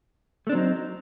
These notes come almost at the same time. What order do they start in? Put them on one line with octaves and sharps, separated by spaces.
A3 D4 C4 F#3 D#4